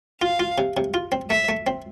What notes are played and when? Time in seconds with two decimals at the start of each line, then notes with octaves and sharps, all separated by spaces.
0.21 F4 F5
0.40 F4
0.58 C3
0.77 C3
0.94 F4
1.12 C4
1.30 A3 E5
1.49 A3
1.67 C4